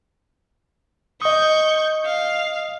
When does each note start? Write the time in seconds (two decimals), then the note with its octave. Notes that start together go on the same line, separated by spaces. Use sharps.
1.22 D#5 C#6 D#6 G6
2.06 F5